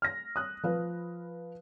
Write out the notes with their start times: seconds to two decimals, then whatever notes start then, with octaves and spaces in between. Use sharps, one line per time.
0.02 F6 A#6
0.36 D#6 F#6
0.63 F3 B4 F5